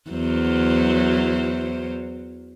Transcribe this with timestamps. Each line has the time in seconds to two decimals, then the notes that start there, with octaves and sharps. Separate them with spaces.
0.10 E2 F#3 C5